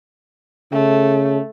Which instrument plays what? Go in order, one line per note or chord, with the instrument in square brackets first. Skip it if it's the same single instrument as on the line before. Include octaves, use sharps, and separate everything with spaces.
[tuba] C#3 [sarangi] A3